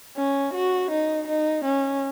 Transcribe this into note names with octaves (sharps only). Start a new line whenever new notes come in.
C#4
F#4
D#4
D#4
C#4